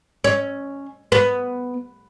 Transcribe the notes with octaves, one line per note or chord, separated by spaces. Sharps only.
C#4
B3